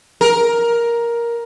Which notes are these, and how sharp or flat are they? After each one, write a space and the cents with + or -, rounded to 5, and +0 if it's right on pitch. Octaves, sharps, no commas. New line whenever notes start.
A#4 +10